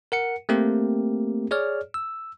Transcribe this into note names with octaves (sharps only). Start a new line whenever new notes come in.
A#4 F#5 C#7
A3 A#3 C4 G4 A#4
G#4 C#5 D5 F6
E6